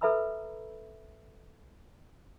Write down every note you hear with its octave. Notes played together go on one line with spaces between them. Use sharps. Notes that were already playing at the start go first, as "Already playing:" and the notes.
A4 B4 E5 A#5 B5 E6